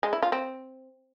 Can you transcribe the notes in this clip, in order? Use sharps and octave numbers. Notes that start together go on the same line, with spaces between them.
G#3
E4
F4
C4